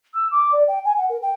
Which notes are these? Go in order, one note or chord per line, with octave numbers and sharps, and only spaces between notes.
E6
D6
D5
G5
G#5
F#5
A#4
G5